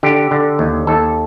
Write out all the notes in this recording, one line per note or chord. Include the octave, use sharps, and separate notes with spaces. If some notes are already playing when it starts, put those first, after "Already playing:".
D3 G4
D3
D#2
D#2 A4